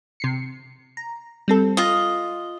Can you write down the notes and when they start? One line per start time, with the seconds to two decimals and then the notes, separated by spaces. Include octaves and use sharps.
0.20 C3 C7 C#7
0.97 A#5
1.48 G3 C4 A4
1.77 F4 D#5